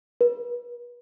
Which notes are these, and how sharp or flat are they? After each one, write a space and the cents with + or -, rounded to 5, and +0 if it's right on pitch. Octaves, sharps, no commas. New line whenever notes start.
B4 -40